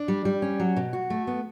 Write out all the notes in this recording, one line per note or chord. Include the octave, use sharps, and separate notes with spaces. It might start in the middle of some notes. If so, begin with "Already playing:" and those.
Already playing: D4
G3
G3
C#4
F#3
B2
F#4
A3
B3